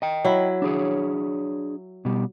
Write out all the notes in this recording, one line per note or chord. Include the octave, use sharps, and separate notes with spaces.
D#5 G5
F#3 E4
D4 G#4 C#5
B2 G3